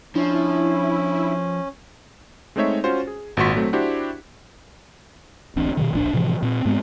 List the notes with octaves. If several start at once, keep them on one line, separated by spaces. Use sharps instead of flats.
F3 C#4 D4 E4
G#3 A3 C4 D#4 C#5 E5
C#4 F4 F#4 C5
G#4
G#1 A#2 F#4 C6 C#6 B6
F#3 A3 C4
D4 E4 F#4 G4 C5
D1 A1 C4 D4
B2 D3 D#3
D1 A#1 C4 D4
A2 C3 E3 F3
A#2 C4
G#2 G#3 B3 C4